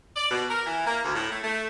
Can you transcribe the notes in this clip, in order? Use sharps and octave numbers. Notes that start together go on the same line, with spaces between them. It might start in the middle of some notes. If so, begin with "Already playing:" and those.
D5
B2
A#4
E3
A#3
D2
A2
A3
A3